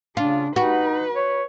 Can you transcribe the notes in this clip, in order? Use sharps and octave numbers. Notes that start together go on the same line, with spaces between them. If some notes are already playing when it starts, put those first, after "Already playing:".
C#3 D4 F4
D#4 F#4 B4
C#5